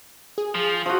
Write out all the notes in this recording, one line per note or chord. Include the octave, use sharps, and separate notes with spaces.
G#4
F3
F3 F#4 D#6